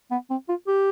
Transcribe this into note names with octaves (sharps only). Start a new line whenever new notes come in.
B3
C4
F4
G4